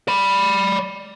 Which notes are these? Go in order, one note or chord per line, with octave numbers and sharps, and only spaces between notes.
D5 B5